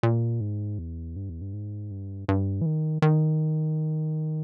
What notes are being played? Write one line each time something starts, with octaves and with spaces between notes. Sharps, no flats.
A#2
G#2
E2
G2
E2
G2
G#2
G2
G2
E3
D#3
D#3